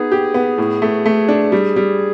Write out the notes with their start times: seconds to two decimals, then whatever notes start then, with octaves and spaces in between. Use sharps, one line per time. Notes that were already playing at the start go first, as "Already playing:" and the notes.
Already playing: B3 D#4 G#4
0.12 G4
0.34 B3
0.58 A2
0.82 A3
1.06 A3
1.29 D4
1.52 G3
1.76 G3